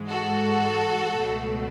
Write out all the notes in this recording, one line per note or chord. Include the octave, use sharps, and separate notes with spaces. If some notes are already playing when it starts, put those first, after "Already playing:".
Already playing: G#2 E3 G#3
F#4 A4
C#2 B2 F#3 A3